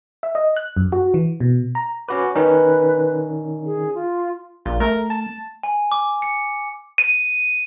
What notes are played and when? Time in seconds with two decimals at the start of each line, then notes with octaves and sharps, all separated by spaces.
0.23 E5
0.35 D#5
0.57 F#6
0.77 F#2
0.92 F#4
1.14 E3
1.40 B2
1.75 A#5
2.09 C#4 F#4 B4 D6
2.35 D#3 C#4 D#4 B4
3.65 G#4
3.95 F4
4.66 A#1 F4
4.80 A3 A#4
5.10 A5
5.63 G#5
5.92 D6
6.22 C#7
6.98 D#7